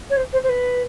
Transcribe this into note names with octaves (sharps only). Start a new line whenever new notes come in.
C#5
C5
C5
C5
B4